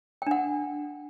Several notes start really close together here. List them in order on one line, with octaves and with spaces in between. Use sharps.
G5 D4 F#5